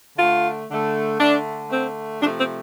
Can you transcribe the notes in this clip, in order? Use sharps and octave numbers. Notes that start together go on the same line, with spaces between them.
D3 A3 F4
D3 A3
D3 A3 D4
D3 A3 C4
C3 F3 A3 D4
C4